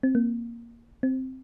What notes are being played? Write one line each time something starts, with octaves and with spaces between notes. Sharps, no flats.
C4
A#3
C4